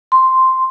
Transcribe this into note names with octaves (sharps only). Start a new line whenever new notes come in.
C6